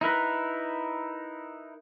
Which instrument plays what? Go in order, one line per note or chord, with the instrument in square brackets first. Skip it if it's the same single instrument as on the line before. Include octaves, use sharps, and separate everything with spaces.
[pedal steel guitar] D#4 E4 A#4 B4